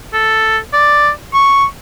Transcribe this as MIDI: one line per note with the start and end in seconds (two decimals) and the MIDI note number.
0.13 0.58 69
0.73 1.10 74
1.34 1.65 85